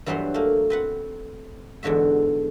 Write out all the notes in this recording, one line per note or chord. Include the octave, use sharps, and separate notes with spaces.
G2 E3 F#3 B3 C5 F#5
A3 A#3
C4 B4 F#5
E2 G#2 D3 F#4 E5